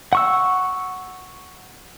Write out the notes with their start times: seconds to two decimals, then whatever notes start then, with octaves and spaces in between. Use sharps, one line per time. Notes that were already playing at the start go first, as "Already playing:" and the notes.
0.13 F#5 C#6 E6